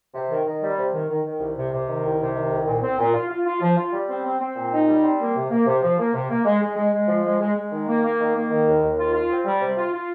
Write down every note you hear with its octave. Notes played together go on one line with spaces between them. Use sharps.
C3
D#3
D#3
G3
C3
D#3
D#3
D#3
C2
C3
C3
D#3
C2
C3
D#3
C2
A#2
C4
A#2
F4
F4
F4
F3
F4
G3
C4
C4
C4
A#2
D#4
G3
C4
A#3
C3
A#3
C3
F3
A#3
C3
A#3
G#3
G#3
G#3
G#3
F3
G#3
G#3
G#3
D#3
A#3
A#3
D#3
A#3
D#3
D#2
D#2
F4
F4
C4
G3
C3
F4
F4